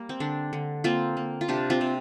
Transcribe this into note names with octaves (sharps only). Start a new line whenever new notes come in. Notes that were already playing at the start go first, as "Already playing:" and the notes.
Already playing: G3 A#3
C4
D3 D4
D3
A#3 C4 F4
A#3
F4
C3 D4 G4
C4 F4
C3